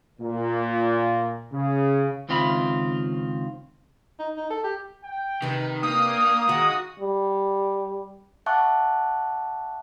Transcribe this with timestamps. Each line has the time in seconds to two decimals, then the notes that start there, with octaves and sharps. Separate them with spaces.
0.20 A#2
1.52 C#3
2.29 C#2 D#3 C4 F4 E5 B5
4.19 D#4
4.37 D#4
4.50 A4
4.64 G4
5.05 G5
5.42 C3 D#3 B4
5.83 A#3 D4 F5 G5 D#6
6.49 D#3 G#3 A#3 F#4 A#5
7.00 G3
8.46 E5 F#5 A5 C#6 D6 F#6